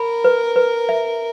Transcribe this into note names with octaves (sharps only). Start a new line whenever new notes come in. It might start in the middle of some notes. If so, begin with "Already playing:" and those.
Already playing: A#4 B5
B4
B4
E5